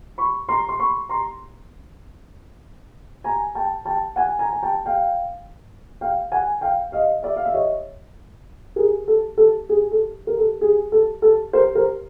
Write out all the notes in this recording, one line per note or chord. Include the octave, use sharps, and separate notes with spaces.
B5 C#6
A#5 C6
C6
B5 C#6
A#5 C6
G#5 A#5
G5 A5
G5 A5
F#5 G#5
G#5 A#5
A#5
G5 A5
F5 G5
F5 G5
F#5 G#5
F5 G5
D#5 F5
D5 E5
F5
E5
C#5 D#5
G#4 A#4
A4
A4
G#4
A4
A#4
A4
G#4
A4
A4
A#4 C5
A#4 C5